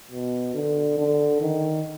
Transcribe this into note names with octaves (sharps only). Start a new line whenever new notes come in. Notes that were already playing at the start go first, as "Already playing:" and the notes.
B2
D3
D3
D#3